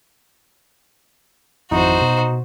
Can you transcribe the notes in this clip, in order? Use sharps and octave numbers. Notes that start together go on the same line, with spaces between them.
G#1 F2 D#4 E4 F#4 C5
B2